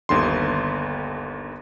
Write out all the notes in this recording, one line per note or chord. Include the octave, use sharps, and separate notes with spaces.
G1 D#2 D3 C6